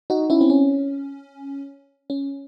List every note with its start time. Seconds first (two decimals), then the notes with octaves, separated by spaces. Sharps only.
0.10 D#4 F#4
0.30 C#4 E4
0.41 C4
0.50 C#4
2.10 C#4